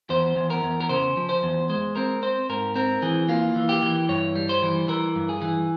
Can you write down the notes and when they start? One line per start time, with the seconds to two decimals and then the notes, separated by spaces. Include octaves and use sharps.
0.10 E2 C5
0.36 E2
0.50 A#4
0.63 E2
0.81 A#4
0.89 C#3 C5
1.17 F3
1.29 C5
1.43 E2
1.69 G#3 C5
1.95 C4 A#4
2.23 C4 C5
2.50 G#2 A#4
2.76 C4 A#4
3.02 E3 G#4
3.29 A#3 F4
3.56 E3
3.69 G4
3.83 E3
4.09 G2 C#5
4.35 G3
4.49 C5
4.63 E3
4.88 E3 A#4
5.15 G2
5.29 G#4
5.42 E3